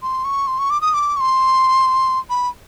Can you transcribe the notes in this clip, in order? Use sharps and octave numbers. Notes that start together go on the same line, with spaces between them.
C6
C#6
C6
C#6
D6
D#6
D6
C#6
C6
B5